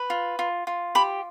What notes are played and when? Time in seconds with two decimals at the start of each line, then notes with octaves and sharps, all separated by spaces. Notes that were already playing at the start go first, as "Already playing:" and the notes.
Already playing: B4
0.10 F4
0.39 F4
0.67 F4
0.95 G4 B5